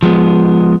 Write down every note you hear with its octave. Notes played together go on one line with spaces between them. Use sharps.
F3 G#3 B3